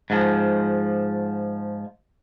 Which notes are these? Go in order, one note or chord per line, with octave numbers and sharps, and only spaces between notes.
G#2 F3